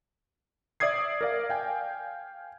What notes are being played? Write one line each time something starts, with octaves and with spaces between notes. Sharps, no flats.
D5 E5 D#6 G#6 C7
A#4 D5 F5
F5 G5 G#5